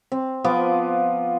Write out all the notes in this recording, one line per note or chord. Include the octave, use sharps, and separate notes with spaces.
C4
F3 B3 F4 D6